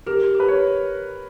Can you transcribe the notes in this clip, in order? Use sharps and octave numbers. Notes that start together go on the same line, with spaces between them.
G4 A#4
G4 B4
C#5